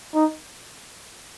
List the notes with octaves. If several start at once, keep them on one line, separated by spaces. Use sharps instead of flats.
D#4